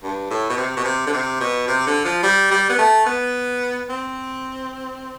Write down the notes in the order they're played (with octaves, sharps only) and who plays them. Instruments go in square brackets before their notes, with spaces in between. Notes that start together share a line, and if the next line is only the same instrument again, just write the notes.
[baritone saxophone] G2
A2
B2
C3
B2
C3
D3
C3
B2
C3
D3
F3
G3
G3
B3
A3
B3
C4